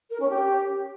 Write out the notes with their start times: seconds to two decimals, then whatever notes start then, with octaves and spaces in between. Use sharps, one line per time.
0.10 A#4
0.20 C#4
0.30 G4